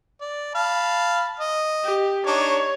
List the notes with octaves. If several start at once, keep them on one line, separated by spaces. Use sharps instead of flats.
D5
F5 A5 B5
D#5
G4
D4 D#4 C#5